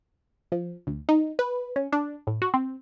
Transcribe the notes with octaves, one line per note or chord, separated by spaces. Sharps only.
F3
D2
D#4
B4
C#4
D4
A2
F#4
C4